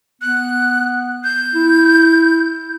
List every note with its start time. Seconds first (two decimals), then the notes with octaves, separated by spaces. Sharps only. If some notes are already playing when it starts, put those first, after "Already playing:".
0.21 B3 F#6
1.24 G6
1.55 E4